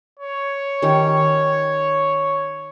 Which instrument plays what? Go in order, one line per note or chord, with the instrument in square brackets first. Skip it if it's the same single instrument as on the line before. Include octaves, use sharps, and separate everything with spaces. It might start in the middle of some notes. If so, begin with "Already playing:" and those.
[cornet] C#5
[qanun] D#3 C#4 G4